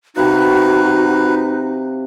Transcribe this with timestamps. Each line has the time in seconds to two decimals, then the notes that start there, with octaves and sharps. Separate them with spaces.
0.17 C3 D#4 F#4 B4 F5